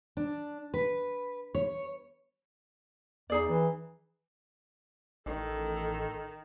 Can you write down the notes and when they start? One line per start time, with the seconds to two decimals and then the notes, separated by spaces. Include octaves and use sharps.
0.17 D4
0.74 B4
1.55 C#5
3.30 E2 D#4 G#4 D5
3.49 E3
5.26 A1 D#3 A4